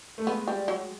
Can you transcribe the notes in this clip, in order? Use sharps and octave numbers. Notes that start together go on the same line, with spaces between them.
A3
G#3 B3
G3
F#3